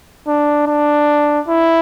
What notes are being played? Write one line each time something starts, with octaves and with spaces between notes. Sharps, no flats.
D4
D4
E4